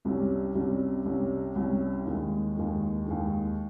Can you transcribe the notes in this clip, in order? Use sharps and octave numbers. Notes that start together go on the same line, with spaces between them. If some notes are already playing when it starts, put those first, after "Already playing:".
C2 C3 G3 C#4
C2 C3 G3 C#4
C2 C3 G3 C#4
C2 C3 G3 C#4
D#2 D#3 G#3
D#2 D#3 G#3
D#2 D#3 G#3